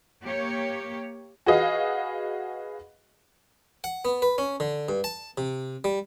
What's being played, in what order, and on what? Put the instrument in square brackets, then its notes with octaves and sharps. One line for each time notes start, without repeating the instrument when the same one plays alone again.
[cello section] A#3 G4 C#5
[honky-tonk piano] F#4 G#4 B4 D#5 F5
[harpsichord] F#5
B3
B4
C#4
D3
G2
A5
C3
G3